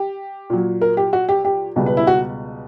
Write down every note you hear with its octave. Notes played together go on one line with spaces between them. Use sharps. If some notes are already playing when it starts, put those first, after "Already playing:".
Already playing: G4
A#2 F#3
A#4
G4
F#4
G4
G4
C#2 B2 G3
B4
E4
F#4